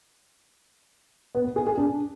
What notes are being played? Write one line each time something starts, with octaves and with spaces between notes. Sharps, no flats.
B3
B3
G#4
G#4
D4